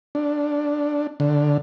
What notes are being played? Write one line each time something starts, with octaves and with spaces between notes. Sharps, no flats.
D4
D3